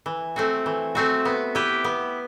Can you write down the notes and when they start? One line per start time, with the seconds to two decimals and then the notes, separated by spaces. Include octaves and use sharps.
0.06 E3
0.36 A3 C4 F#4
0.66 E3
0.95 A3 C4 F#4
1.25 B3
1.55 E4 G4 B4
1.84 B3